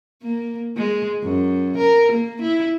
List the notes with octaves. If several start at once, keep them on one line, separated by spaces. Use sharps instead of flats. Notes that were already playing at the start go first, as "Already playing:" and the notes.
A#3
G#3
F#2
A#4
A#3
E4